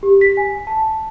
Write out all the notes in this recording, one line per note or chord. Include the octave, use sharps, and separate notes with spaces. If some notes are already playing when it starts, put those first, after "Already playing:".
G4
B6
G#5
A5